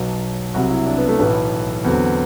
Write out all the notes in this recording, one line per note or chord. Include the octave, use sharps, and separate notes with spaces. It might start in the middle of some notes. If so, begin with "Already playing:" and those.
Already playing: B1 B2 F#3
C2 C3 F#3 F#4
E4
D4
B3
A3
B1 A2 E3 B3
E2 D3 F#3 C4